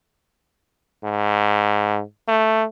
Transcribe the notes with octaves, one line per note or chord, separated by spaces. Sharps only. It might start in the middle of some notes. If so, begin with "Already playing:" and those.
G#2
A3